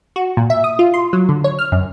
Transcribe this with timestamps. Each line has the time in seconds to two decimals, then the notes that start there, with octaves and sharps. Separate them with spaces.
0.16 F#4
0.37 A#2
0.50 E5
0.64 D#6
0.79 F4
0.94 C6
1.13 F#3
1.29 D3
1.44 C#5
1.59 F6
1.72 F#2